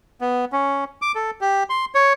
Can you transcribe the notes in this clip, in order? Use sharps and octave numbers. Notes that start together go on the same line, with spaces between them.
B3
C#4
D6
A4
G4
C6
C#5